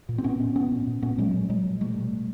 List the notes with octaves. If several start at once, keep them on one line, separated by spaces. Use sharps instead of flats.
A#2
C4
A#2 B3 C#4
A#2
A#2 B3 C#4
A#2
A#2
A#2 B3 C#4
A#2 F#3 G#3
A#2
A#2 F#3 G#3
A#2
B2 G3 A3
B2
B2